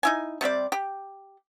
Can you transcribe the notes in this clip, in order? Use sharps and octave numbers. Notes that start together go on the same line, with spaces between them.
D#4 E4 G#5
C3 G3 C4 D5
G4